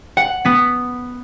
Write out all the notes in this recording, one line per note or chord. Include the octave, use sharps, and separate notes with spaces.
F#5
B3 B6